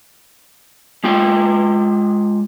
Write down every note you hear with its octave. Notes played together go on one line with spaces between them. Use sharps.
G#3 F4 G5